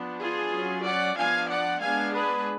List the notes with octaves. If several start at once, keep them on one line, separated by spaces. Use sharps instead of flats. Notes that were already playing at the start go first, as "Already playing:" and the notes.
Already playing: F3 B3 D4
F4 G#4
F#3 C#4
D5 F#5
F3 B3 D4 F5 G#5
D5 F#5
G#3 B3 D4 F5 G#5
G#4 B4